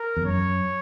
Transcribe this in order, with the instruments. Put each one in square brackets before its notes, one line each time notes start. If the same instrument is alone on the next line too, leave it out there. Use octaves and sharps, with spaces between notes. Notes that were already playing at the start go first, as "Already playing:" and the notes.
Already playing: [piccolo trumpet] A#4
[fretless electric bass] E2
[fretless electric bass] F#2 [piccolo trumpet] C#5